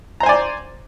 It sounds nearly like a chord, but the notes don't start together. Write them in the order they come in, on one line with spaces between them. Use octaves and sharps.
A#5 C5 G#5 D5